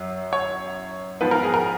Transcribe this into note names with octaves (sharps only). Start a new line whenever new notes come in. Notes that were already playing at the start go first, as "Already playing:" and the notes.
Already playing: F#2 F#3
C#5
G#2 F3 B3 B4
A#4
G#4
A#4